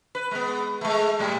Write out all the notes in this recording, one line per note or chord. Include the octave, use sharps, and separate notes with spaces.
B4
G#3 B3
G#3 A3
A2 G3